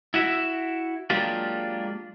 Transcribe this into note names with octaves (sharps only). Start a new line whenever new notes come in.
E4 F#4 E5
F#3 G#3 A#3 D4 F4 G4